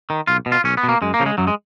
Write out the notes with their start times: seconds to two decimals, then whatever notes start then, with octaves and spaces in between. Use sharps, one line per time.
0.10 D#3
0.27 B1 F4
0.46 B2
0.52 F4
0.64 B1 C#4
0.77 B3
0.83 B2
0.89 A#3
1.02 F#2 G#3
1.14 A#3
1.20 C#3 F3
1.26 G#3
1.38 F#2 F#3
1.47 G#3